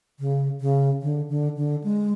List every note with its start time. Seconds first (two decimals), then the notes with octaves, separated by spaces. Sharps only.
0.20 C#3
0.61 C#3
1.02 D3
1.29 D3
1.57 D3
1.84 G#3